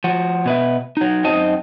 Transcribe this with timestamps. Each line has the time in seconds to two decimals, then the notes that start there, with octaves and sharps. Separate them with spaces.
0.04 F3 F#4
0.46 B2 B4 E5
0.97 F#3 D#4
1.24 F#2 C4 D#4 D#5 A5